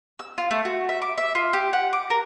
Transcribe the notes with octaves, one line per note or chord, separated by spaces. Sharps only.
E6
F4
A3
F#4
E5
D6
E5
F4
G4
F#5
D6
A#4